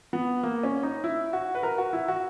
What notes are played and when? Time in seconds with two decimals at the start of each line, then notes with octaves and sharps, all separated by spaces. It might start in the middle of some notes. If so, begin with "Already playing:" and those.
0.13 B3
0.43 A#3
0.63 C#4
0.83 D#4
1.04 E4
1.33 F#4
1.55 B4
1.63 A#4
1.78 F#4
1.93 E4
2.08 F#4